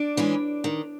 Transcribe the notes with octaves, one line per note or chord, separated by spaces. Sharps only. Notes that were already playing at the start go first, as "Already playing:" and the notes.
Already playing: D4 D5
E3 G#3 C#4 E4
D#3